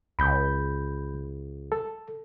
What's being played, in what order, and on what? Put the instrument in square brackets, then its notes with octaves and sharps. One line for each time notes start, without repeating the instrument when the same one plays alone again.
[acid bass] C#2 [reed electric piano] B5 G6
[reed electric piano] A4